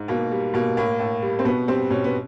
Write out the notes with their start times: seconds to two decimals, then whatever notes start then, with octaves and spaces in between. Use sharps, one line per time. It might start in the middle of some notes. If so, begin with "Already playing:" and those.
Already playing: G#2
0.08 B2 A#3
0.31 G3
0.54 B2 A#3
0.77 A2 A#3
0.99 A2
1.22 G3
1.39 C4
1.45 B2 B3
1.68 G3 C4
1.90 B2 C#4
2.04 B3